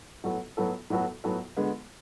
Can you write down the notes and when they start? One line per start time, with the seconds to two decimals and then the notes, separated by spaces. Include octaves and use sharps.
0.24 A2 F#3 B3 F#4 A4
0.57 A2 F#3 B3 F#4 A4
0.90 A2 F#3 B3 F#4 A4
1.24 A2 F#3 B3 F#4 A4
1.57 D3 G#3 B3